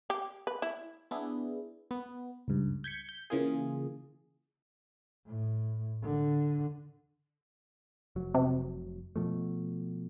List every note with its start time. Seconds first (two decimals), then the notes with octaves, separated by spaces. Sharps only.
0.10 G4
0.47 B4
0.62 E4
1.11 B3 D4 E4 G#4
1.91 B3
2.48 C#2 G2
2.84 G6 G#6 B6 C#7
3.09 G6
3.30 C#3 E3 A#3 F4 G#4
5.26 A2
6.03 D3
8.16 F1 F#3
8.34 C3
9.16 B2 F3 A3